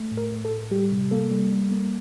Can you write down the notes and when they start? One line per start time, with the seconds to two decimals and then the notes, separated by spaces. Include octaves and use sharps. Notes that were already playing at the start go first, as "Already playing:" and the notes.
Already playing: A3
0.11 A2
0.17 A#4
0.31 A2
0.45 A4
0.51 A2
0.71 G3 G4
0.91 C3
1.11 A#3 A4
1.31 G3
1.51 G3
1.71 A#3